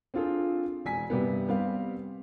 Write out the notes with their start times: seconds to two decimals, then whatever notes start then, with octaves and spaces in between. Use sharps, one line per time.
0.14 C4 D4 F4 G#4 A4
0.85 E1 G#5 B6
1.10 G2 C3 G3 B3
1.49 G3 B3 C4 F5